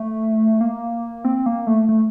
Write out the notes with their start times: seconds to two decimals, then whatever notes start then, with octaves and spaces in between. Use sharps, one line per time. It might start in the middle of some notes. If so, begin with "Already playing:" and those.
Already playing: A3
0.61 A#3
1.24 C4
1.46 A#3
1.67 A3
1.89 A3